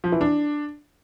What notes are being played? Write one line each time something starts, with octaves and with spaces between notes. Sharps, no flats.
F3
E3
D4